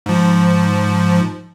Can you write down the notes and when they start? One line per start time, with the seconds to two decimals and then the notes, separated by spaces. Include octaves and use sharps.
0.06 G#2 F3